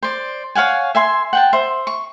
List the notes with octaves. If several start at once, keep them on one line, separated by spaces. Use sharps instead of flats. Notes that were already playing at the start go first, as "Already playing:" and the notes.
C5 D5
C#5 F5 F#5 G#5
E5 G#5 C6
F#5 G5 A5
C5 E5
C#6